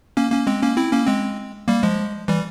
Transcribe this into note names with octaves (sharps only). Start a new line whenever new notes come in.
A#3 C#4
A#3 C#4
G#3 C4
A#3 C#4
C4 E4
A#3 C#4
G#3 C4
G3 A#3
F3 G#3
E3 G3